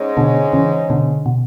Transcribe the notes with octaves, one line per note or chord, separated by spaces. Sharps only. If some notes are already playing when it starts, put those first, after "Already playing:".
Already playing: G#2 G#3 C#4 G#4 C#5
B2 D3
C#3 E3
B2 D3
B2